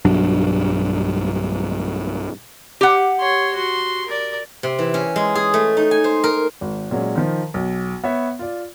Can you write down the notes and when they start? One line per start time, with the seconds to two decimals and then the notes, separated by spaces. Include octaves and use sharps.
0.05 B1 G2 F#3 D4
2.81 G4 F#5
3.20 C#5 C6
3.54 F#4 C6
4.07 A#4 D5
4.63 C3
4.79 E3
4.94 C#4
5.16 G#3
5.35 G#4
5.54 A3
5.77 D#4
5.91 G#5
6.04 C5
6.24 A#4
6.61 G#1
6.91 A#2 F#3 G#3 C#4
7.16 D#3 F3
7.54 B1
8.04 B3 C#5 E5
8.39 F4 D5